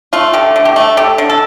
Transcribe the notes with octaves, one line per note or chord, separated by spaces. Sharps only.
A3 F4
D3 G4
D3
G4
A3
A3 G4
D3
A4